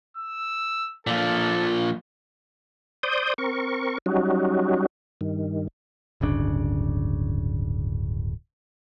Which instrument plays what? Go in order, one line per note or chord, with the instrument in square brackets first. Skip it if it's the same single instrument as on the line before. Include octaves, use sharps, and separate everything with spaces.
[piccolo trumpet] E6
[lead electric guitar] A#2 F3 [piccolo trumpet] A4
[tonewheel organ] C5 D5 D#6 G6
C4 A#4 C#6
F#3 G3 C#4 D#4 F#4
G2 D#3
[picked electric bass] D1 G1 C#3 D4